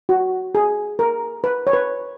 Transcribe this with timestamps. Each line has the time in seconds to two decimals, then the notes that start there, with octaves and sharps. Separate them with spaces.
0.09 F#4
0.55 G#4
0.99 A#4
1.44 B4
1.67 C#5
1.73 B4